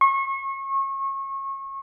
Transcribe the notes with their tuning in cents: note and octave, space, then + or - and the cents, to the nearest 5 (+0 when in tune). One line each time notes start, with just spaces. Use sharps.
C#6 -30